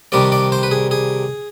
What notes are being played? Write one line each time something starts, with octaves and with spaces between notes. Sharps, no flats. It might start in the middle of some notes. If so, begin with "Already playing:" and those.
C2 C3 D#3 G3 D4 D5
D5
C5
B4
G#4
G#4